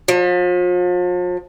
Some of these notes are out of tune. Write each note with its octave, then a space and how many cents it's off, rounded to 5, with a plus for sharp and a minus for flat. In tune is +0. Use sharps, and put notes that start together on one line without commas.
F3 +40